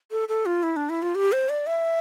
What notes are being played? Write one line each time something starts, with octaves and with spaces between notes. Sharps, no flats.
A4
A4
F4
E4
D4
E4
F4
G4
C5
D5
E5